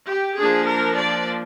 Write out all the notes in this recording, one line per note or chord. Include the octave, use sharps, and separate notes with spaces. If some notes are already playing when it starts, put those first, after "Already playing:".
G4
F3 A#3 D4 G#4
A#4
D5